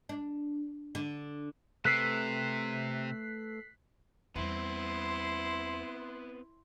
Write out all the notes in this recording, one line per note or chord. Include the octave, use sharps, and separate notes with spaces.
D4
D3
C3 A3 B4 E6 F#6 B6 C7
E2 G3 B3 C4 E4 C6